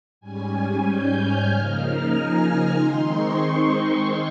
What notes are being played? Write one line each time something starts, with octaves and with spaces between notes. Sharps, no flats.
G#2 G3 C#4 G#5
G6
F6
C#3 F3 A#3 D#4 F6
A#5
G#5
A#5
D#3 G#3 C4 D#4 C6
C#6
C6